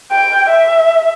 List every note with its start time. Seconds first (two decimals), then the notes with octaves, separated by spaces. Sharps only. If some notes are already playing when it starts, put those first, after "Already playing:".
0.12 G5
0.49 E5